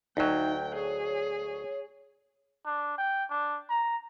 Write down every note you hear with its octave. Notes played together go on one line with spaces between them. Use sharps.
D2 F#3 D#4 G5
G#4 C#5
D4
G5
D4
A#5